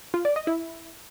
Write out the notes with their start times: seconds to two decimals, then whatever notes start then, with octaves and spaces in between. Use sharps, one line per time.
0.14 F4
0.25 D5
0.36 D#5
0.47 E4